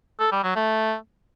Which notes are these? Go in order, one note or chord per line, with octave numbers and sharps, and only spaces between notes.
A4
G3
F#3
A3